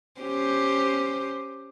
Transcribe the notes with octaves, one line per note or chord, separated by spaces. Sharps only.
C#4 G4 C5